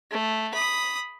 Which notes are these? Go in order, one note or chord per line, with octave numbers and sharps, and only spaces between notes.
A3
B5 D#6